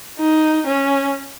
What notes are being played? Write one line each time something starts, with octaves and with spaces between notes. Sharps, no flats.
D#4
C#4